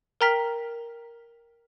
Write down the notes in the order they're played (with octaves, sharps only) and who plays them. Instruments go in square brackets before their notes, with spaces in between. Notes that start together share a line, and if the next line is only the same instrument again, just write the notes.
[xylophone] A#4 G5 A#5 F6 B6